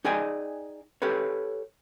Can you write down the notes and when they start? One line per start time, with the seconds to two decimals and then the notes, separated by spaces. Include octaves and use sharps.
0.05 D#4 G#4 D5 D#5 G5 G#5
1.02 G4 A4 B4 C#5